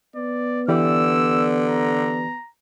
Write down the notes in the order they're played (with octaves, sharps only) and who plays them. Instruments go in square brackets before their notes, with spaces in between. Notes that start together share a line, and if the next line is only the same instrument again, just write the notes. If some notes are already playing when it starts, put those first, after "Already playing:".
[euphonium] B3 [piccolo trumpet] D5
[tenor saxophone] D3 [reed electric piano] E3 G4 D5 [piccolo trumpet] E6
[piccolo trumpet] A#5